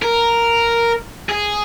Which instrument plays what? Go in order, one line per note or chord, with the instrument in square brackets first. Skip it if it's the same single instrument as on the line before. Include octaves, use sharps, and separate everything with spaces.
[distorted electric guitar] A#4
G#4